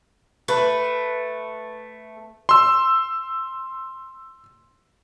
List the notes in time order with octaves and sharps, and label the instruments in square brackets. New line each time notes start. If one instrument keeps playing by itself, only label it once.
[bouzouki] A3 B4
[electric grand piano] C6 E6